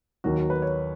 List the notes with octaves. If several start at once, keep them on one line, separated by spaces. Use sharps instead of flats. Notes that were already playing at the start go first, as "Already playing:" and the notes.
D#2 D#3 F#3 F#4
F#4
B4
C#5